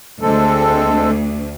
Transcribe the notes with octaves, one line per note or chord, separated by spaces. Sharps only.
D2 G#3 C4 A4